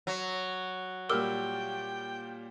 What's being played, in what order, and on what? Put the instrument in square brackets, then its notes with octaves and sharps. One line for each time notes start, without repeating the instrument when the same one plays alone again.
[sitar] F#3
[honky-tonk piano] A#2 G3 D6 [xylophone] A#4 E6 F6 [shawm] G5